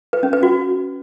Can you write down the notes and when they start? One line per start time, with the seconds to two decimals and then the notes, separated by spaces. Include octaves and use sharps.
0.13 B4
0.23 C#4
0.33 B4
0.43 F#4